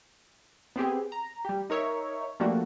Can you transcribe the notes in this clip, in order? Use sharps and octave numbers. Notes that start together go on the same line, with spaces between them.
B3 C4 G4 G#4
A#5
G3 G4
D#4 A#4 C#5 E5
F3 G3 A3 A#3 D4 F#4